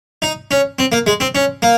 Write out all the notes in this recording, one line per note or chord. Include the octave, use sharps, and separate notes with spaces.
D#4
C#4
C4
A#3
G#3
C4
C#4
A#3